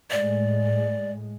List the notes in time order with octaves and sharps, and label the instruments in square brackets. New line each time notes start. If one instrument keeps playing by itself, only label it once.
[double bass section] A2 G#3 [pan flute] D5